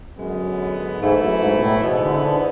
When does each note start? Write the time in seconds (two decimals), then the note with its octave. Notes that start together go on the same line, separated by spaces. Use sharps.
0.17 F#2 D3 G#3 B3
0.99 G#2 E3 A3 E4
1.19 F#2
1.40 G#2
1.56 B2
1.60 A2
1.80 G#2 B2 E3 B3
2.02 D3
2.22 D3